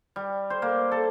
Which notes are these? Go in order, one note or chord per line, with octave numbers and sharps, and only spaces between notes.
G3
C5
A#3
A4